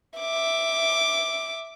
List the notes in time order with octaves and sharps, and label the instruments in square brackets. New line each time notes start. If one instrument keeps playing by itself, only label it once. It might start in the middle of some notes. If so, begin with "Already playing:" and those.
[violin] E5 D6